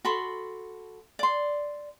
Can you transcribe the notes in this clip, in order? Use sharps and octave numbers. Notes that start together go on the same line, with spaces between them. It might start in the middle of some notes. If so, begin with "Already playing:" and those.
F#4 A4 B5 C6
D5 C6